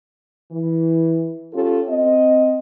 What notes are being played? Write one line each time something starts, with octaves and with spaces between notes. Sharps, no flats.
E3
C#4 F4 G4 A4
C4 D#5